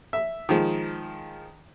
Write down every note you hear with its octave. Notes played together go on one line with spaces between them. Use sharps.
E5
D#3 F3 G#3